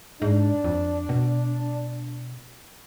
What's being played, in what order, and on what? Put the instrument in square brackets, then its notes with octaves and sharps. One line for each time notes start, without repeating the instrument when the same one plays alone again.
[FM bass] G#2 [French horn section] D4
[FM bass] F2
B2